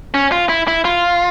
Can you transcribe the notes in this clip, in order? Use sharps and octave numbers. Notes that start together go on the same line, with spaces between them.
C#4
F4
E4
E4
F4